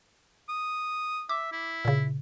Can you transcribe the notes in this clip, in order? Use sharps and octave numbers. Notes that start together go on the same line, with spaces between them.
D#6
E5 D6
E4
A#2 C#3